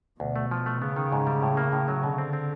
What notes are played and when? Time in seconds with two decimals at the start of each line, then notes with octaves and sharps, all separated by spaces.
0.20 D2 B2
0.36 A3
0.51 F3
0.66 A3
0.81 C#3 B3
0.96 D#3
1.12 G#2
1.27 G3
1.43 A2
1.57 A#3
1.72 A2
1.88 F#3
2.03 B2 D3
2.18 C4
2.33 C4